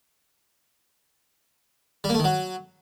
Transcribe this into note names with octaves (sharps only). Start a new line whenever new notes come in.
G3
A#3
A3
D#3
F#3